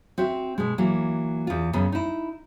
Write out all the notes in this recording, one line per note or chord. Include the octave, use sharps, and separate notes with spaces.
C4 F#4 E5
B2 G#3
E3 F#3 A#3
E2 F4
F#2 C#3 B3
D#4 E4